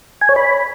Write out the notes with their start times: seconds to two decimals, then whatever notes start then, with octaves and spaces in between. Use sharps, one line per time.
0.21 G#5
0.29 C#5
0.36 B5